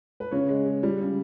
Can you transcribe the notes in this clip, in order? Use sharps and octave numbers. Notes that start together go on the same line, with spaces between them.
B4
C#3 C#5
G#3
G#3
G3
C#3